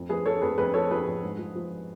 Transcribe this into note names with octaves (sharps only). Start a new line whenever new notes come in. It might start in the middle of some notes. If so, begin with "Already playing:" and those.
Already playing: F2
F3 G#4 B4
F3 A4 C#5
F2 G#4 B4
F2 G#4 B4
F3 A4 C#5
F3 G#4 B4
F2
G#2
F3
F3